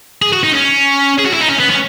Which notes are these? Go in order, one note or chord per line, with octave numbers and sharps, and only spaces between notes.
G#4
F#4
D#4
C#4
G#4
F#4
E4
D#4
C#4
B3
C#4